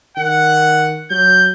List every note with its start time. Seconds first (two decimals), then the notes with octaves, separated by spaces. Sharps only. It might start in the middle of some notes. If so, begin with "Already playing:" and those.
0.17 D#3 F#5
1.10 F#3 G6